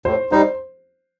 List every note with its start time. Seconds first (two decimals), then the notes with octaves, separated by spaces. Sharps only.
0.05 A2 C5
0.32 G3 D#4 C5